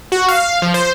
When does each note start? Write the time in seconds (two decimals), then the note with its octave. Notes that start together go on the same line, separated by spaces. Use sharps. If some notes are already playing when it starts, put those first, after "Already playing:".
0.12 F#4
0.28 F5
0.62 F3
0.74 C5